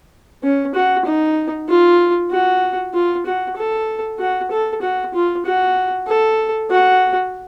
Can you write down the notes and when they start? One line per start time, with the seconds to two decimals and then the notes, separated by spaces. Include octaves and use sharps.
0.43 C#4
0.74 F#4
1.05 D#4
1.68 F4
2.31 F#4
2.94 F4
3.26 F#4
3.57 A4
4.19 F#4
4.51 A4
4.82 F#4
5.14 F4
5.45 F#4
6.07 A4
6.71 F#4